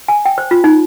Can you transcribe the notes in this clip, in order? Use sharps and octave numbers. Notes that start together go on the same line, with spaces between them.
G#5
G5
C5
F4
D#4